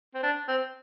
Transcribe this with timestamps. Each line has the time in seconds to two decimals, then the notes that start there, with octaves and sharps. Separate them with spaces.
0.14 C4
0.23 D4
0.48 C4